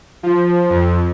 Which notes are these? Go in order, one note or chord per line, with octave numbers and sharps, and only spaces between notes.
F3
F2